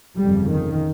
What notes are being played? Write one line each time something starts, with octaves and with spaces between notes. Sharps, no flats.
G1 F2 C#3 G3
D#3